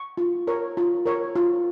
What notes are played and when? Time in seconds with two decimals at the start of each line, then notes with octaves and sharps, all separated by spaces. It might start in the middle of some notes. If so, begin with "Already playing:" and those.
Already playing: C#6
0.17 F4
0.47 A#4 C#5
0.77 F4
1.06 A#4 C#5
1.36 F4